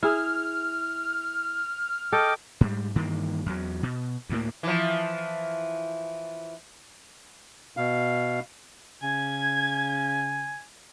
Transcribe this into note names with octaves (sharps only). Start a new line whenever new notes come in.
E4 G#4 F6
A4 D#5 G5 D6
G#2 G3
G2 D#3 E3 A#3
E2 F#3
B2
D2 A2 A#3
E3 F3
B2 F5
C#3 G#5 G#6